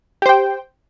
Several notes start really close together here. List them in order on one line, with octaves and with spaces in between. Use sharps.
G4 C5 G5